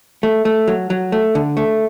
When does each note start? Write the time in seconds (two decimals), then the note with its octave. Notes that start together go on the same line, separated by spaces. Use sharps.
0.23 A3
0.45 A3
0.67 F#3
0.90 F#3
1.12 A3
1.35 D3
1.57 A3